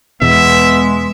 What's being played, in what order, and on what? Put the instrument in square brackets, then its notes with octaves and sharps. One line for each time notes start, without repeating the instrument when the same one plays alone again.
[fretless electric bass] E2 B2 [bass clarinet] G#3 [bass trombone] B3 [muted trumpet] E5